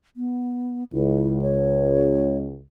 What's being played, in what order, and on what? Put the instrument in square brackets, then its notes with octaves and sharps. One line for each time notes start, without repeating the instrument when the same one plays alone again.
[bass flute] B3
[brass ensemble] C#2 [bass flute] E4
[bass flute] C#5